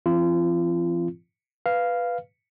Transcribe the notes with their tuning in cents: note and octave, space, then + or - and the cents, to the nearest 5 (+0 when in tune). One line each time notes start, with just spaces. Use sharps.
F3 -45 C4 +0 F4 -35
B4 +0 F5 -5